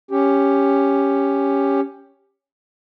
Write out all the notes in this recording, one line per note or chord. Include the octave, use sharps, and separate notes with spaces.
C#4 G4